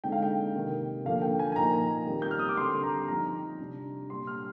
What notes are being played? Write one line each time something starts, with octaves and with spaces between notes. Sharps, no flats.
D3 G#3 C4 D#4 G5
F5
G5
C3 D#3 A#3
D3 F3 A#3 F5
G5
G#5
G#5
A#2 F3 A#3 D#4 A#5
D#3 G3 C4
G6
F6
D#6
D6
D3 G3 C4 C6
A#5
F3 C4 D#4 A#5
C3 G3 D4
A#2 G3 D4 C6
F6